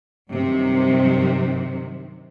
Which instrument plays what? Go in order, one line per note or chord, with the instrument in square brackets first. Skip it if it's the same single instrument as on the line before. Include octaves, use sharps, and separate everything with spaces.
[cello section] G2 C3 D#3 F#3